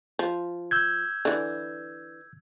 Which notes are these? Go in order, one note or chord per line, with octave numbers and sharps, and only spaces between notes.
F3
E6 G6 G#6
D3 E3